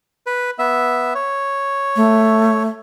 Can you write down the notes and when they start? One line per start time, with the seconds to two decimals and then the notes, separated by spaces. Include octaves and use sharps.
0.27 B4
0.59 B3 E5
1.15 C#5
1.96 A3